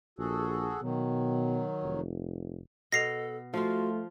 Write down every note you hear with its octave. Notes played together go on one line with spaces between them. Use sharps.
A#1 F#4 G#4 A4
B2 D#3 F#3
F1
B2 A4 A#6 C7 F7
F3 A3 F4 F#4